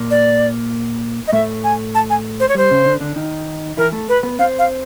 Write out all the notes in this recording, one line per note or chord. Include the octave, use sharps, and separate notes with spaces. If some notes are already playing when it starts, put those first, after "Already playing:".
Already playing: A#2 A#3
D5
D#5
A2 A3 E5
G#5
A5
G#5
C5
C#5
G3 C5
C#3 C#4
D3 D4
D3 D4
D#3 D#4
E3 E4 A#4
A3 A4
B4
B3 B4
C4 C5 F5
F5